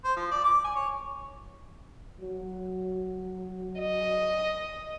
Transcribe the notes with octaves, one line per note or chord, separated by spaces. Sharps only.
C5
F3
D5
D6
G#5
C#5
F#3
D#5